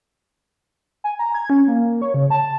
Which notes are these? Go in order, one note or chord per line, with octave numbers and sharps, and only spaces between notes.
G#5
A#5
G#6
C#4
A#3
C#5
C#3
A5